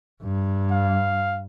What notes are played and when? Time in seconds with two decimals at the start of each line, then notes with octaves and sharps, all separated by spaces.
0.23 G2
0.71 F5